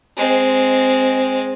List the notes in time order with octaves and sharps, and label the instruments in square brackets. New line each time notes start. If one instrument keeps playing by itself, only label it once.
[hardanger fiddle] G#3 C4